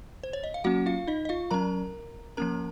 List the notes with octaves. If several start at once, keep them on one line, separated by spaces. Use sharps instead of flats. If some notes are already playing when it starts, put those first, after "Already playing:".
C5
C#5
D#5
F5
F#3 A#3 C#4 F#4 F#5
F4 F5
D#4 D#5
D#5
F4 F5
F#3 C#4 A#4 A#5
F3 A#3 C#4 A#4 A#5